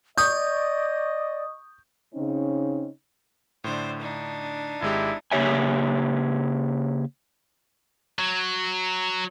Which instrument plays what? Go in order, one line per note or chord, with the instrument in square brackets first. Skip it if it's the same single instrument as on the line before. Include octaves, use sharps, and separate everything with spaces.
[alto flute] D5 [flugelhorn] D#5 [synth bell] C#6 D#6 [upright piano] G6
[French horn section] C#3 C4 C#4 D#4
[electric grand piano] A2 D3 [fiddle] C5 D5
[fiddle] D4 D#4
[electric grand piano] G#1 G#3 G4 [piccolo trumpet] E4
[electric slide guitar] C#3 A#3 G4 C#5 E5 G#5
[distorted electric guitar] F#3